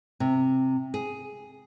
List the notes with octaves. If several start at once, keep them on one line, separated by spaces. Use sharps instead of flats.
C3
G#4